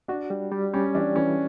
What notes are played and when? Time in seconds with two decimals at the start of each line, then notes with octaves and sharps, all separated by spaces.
0.08 D4 F#4
0.30 G3
0.52 G3
0.73 G3 C#4
0.95 E3 D4
1.16 E3 C#4